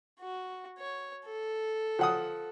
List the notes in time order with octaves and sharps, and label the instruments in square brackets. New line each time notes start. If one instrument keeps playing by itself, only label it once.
[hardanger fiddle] F#4
C#5
A4
[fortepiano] F3 F#5 D#6